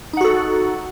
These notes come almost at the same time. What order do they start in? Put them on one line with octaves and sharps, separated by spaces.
D#4 F#5 F#4 A4